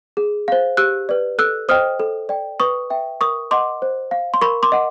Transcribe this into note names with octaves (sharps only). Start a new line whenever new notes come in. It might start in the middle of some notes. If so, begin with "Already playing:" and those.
G#4
C5 F5
G4 E6 F#6
B4 D5
A4 E6 F#6
C5 D#5 G5 D#6 F6
A4
D5 G5
B4 C#6 D#6
E5 G5
A#4 C#6 D#6
D#5 F#5 C6 D6
C5
F5
C6
A#4 B5 C#6
C6 D6
D#5 F#5